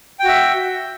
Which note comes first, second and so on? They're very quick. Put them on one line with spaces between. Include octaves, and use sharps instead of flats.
G5 F#4 E5